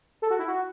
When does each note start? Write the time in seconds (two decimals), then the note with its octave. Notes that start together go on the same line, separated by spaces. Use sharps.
0.22 A4
0.30 F#4
0.39 E4
0.48 F#4